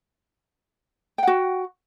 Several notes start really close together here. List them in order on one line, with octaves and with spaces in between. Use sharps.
G5 F#5 F#4